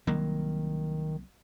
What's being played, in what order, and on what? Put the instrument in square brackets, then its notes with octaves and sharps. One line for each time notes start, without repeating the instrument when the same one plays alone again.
[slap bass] C2 F#3 A#3 [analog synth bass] D#3